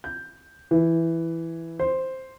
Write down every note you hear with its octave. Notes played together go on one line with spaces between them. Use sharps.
G6
E3
C5